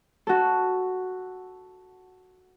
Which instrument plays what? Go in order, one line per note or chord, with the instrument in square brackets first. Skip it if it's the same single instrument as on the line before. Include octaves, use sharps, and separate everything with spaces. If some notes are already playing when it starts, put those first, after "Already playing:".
[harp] F#4 A4